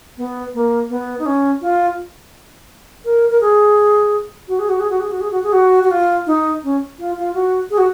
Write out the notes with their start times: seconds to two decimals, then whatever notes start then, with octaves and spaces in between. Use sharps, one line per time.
0.18 B3
0.54 A#3
0.90 B3
1.19 D#4
1.26 C#4
1.62 F4
3.05 A#4
3.30 A#4
3.41 G#4
4.48 F#4
4.59 G#4
4.69 F#4
4.80 G#4
4.90 F#4
5.00 G#4
5.12 F#4
5.21 G#4
5.31 F#4
5.43 G#4
5.53 F#4
5.83 F#4
5.91 F4
6.27 D#4
6.64 C#4
6.99 F4
7.17 F4
7.34 F#4
7.71 G#4
7.78 F#4